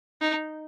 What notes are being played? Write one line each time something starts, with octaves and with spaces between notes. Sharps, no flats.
D#4